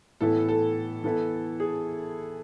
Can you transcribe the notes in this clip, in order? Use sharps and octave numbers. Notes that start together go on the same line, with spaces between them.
A2 E3 B3 E4 A4
A4
E3 B3 E4 A4
G#4